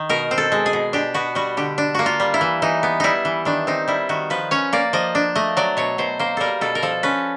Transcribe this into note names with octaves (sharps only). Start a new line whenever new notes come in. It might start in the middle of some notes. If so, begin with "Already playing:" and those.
Already playing: D#3
B2 A#4
C4
A4
G#3
G#4
B2
D4 G4
B3 F#4
G3 F#4
D3 G4
D4
A#3 F#4
F4
G3
E4
E3
E3 D#4
B3
G3 D#4 E4
E3
D#3 D4
C4 D#4
G3 E4
D#3 F#4
F3 B4
C#4 C#5
A#3 D5
F3 D#5
D4
A3 D#5
F#3 D5
B2 C#5
B2 C5
A#3 C5
G3 A4 A#4
B2 A4
A#4
F3 A4
C#4 B4